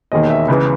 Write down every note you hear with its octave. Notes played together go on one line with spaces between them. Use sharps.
E1 D#2 D#3 D#5
E5
C#2 C#3 E3